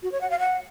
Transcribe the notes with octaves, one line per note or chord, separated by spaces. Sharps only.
F#4
C#5
F#5
F5
F#5